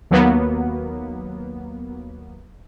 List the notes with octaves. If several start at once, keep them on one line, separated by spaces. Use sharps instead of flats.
D#2 F#3 A#3 B3